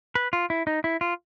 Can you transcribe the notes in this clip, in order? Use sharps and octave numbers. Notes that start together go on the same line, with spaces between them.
B4
F4
E4
D#4
E4
F4